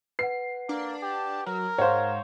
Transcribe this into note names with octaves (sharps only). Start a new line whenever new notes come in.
B4 F#5 C7
A#3 D4
G4
F#3 A#4
G#2 C5 C#5 F5 F#5